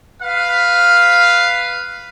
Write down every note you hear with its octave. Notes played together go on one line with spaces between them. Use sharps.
B4 F5